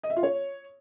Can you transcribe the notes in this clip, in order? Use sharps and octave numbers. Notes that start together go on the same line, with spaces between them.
D#5
E5
F4
C#5